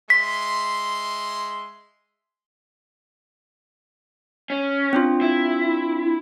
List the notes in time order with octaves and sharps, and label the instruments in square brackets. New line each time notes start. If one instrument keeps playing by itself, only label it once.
[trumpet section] G#3 E5 C6 [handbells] B6
[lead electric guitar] C#4
[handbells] C4 D4 F4
[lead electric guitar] E4